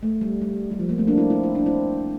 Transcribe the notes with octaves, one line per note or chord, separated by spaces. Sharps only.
A3
G3
G3
G3
F3
G3 A#3
A3 C4
A#3 D4
C4 E4
C4 E4
E4
D4
C4 E4